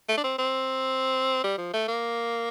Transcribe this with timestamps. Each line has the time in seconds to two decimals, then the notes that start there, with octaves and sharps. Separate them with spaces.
0.09 A3
0.17 D4
0.24 C4
0.39 C4
1.44 G3
1.58 F3
1.73 A3
1.88 A#3